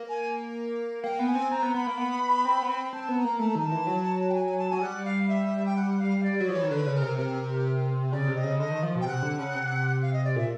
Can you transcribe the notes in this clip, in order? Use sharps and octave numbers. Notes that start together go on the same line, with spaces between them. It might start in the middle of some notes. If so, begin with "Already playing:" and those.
Already playing: A#3
G#5
A#3 G5
B3
G#5
C4
C4 A#5
B3
B3 B5
A#3
B3
C4
B3
C4
C4 A5
B3
A#5
A#3
A3 A5
A#5
D#3 A5
E3
F#3
G5
G#5
G#5
A5
F#3 G#5
G3 F#5
F5
E5
G5
F#5
F5
D5
F#3
F3 C#5
E3
D#3
D3 B4
C#3
A#4
C3
C3 A#4
C#3 D5
C3
D#5
C#3
D3 D#5
D#3
F3
B2 G5
C3 F#5
D3
C#3
C3
F5
D#5
D5
A#2 E5